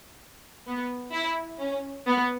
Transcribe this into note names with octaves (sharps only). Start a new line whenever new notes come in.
B3
E4
C#4
B3